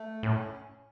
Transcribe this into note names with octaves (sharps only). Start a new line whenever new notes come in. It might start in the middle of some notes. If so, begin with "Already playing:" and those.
Already playing: A3
A2 C#4